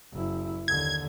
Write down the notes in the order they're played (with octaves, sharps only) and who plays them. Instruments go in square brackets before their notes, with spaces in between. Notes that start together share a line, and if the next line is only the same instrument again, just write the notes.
[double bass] F#1 E4
[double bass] D#2 D3 [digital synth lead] G#6